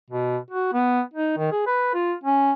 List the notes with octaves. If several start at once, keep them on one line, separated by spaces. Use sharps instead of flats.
B2
F#4
B3
D#4
D#3
G#4
B4
F4
C#4